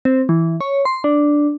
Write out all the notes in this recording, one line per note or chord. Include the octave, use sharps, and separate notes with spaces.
C4
E3
C#5
C6
D4